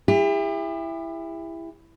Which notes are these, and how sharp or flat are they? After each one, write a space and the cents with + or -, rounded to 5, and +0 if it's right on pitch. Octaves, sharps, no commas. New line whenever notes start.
E4 +10 G4 +40